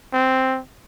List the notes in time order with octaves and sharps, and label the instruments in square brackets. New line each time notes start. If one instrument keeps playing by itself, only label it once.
[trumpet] C4